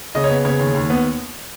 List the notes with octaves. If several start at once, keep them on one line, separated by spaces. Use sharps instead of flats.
C#3 D#5
C#5
B3
C#3 C#5
D#2
D#2
B3